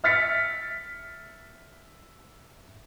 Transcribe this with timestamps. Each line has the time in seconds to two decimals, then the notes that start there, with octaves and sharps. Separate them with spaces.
0.04 E5 F6 A6 B6 C#7